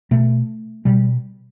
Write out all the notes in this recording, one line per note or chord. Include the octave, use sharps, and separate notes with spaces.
B2 A3
B2 G3